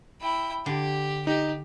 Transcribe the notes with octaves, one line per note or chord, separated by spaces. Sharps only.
E4 G5
D3 G4
D#4 G4